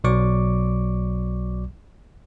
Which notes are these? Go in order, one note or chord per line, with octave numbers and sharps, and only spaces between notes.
B1 B2 F#3 D5 C#6 D6